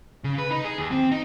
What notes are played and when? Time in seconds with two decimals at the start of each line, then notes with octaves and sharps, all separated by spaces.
0.24 C#3
0.38 B4
0.51 D#4
0.64 G#4
0.78 D#2
0.91 C4
1.11 D#4